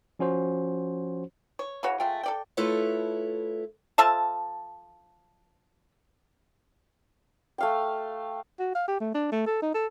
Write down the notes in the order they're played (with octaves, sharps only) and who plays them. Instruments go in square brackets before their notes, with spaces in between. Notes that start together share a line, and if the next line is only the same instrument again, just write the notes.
[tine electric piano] F3 C#4 F#4 C5
[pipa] C#5
C#3 E3 F#4 C#5
G#3 A3 F4 G5
A4 D5 G5
[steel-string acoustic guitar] A3 E4 F4 A4 B4 C#5
[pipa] F3 A4 E5 A5
[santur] A3 F5 G5
[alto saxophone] F#4
F5
G4
A3
D4
A3
A4
D#4
A4